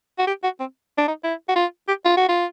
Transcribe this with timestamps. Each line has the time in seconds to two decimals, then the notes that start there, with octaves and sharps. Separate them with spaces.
0.18 F#4
0.27 G4
0.44 F#4
0.60 C4
0.98 D4
1.08 D#4
1.24 E4
1.48 F#4
1.56 F4
1.88 G4
2.05 F4
2.17 F#4
2.29 F4